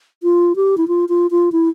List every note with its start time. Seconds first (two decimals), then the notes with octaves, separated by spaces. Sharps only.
0.23 F4
0.56 G4
0.78 E4
0.88 F4
1.09 F4
1.31 F4
1.52 E4